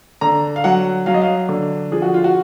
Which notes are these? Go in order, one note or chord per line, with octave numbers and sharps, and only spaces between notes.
D3 A#5
F5
F#3 F#5
F#3 F5
D#5
F5
D3
F3 G#4
F#4
F4
F#4